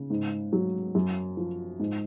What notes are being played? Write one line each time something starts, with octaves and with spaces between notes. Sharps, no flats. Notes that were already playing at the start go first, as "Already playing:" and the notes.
Already playing: C#3
G#2
F#3
F#2
F3
G#2